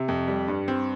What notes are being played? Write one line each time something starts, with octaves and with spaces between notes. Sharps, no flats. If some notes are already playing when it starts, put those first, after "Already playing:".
Already playing: C3
F2
G3
G2
C4